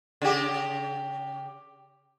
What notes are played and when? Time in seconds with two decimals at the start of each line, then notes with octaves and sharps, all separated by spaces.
0.22 C#3 G4